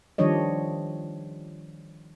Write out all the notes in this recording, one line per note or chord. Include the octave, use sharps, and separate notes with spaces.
D#3 F3 G3 D4 C#5 D#5